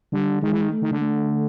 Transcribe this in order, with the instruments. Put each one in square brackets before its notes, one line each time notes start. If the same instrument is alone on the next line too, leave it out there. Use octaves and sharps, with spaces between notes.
[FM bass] D3 [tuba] G3
[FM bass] D#3 [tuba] G#3
[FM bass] E3
D#3
[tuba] A3
[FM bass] D#3
D3
[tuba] A3